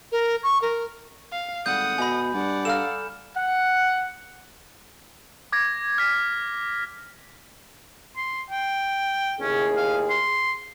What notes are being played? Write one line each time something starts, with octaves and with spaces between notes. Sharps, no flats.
A#4
C#6
A#4
F5
G#1 G3 A3 F#5 D#6 G6
B2 D#5 E5 G#5 B5
G2 D5 F#5
A4 F5 A#5 F6 E7
F#5
D6 G#6 A#6
F6 G#6 B6
C6
G5
D#2 A2 C#4 G#4
F5
C6